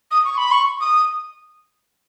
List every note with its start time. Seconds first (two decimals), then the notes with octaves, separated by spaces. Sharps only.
0.11 D#6
0.25 C#6
0.38 B5
0.52 C#6
0.80 D#6